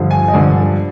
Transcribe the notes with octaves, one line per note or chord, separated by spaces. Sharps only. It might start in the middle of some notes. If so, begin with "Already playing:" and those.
Already playing: G2 D3 F3
G#5
D#5
G2 D3 F3 D5